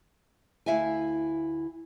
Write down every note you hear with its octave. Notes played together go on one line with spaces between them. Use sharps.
D2 E4 E5 F5 G#5